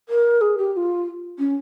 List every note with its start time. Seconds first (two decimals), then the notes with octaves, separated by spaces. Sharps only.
0.09 A#4
0.41 G#4
0.58 G4
0.73 G4
0.77 F4
1.39 C#4